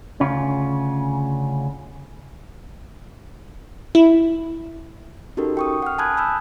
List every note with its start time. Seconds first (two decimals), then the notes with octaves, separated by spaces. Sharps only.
0.20 D2 C#3 C#4 F4
3.95 E4
5.37 C#4 D#4 F#4 G4 A4 A#4
5.57 G5 C#6 D#6
5.82 F#5 F6
5.98 G#5 A5 B5 D#6 F#6 G#6
6.17 A5 B5 E6 G6